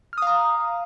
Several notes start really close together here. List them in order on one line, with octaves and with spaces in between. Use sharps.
F6 D#6 F5 A#5